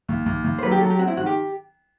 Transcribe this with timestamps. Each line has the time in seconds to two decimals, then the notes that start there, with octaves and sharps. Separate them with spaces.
0.08 D#2
0.26 D#2
0.44 D#2
0.58 C5
0.62 F#3 B4
0.72 G4
0.80 F#3 A4
0.90 G4
0.99 C4 F#4
1.08 E4
1.17 D#3 F#4
1.26 G4